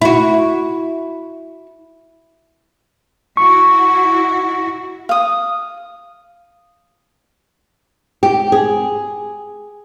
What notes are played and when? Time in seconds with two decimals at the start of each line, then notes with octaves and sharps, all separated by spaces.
0.01 E4 F#4
3.37 E4 F#4 C#6
5.09 F5 D#6
8.23 G4
8.52 G#4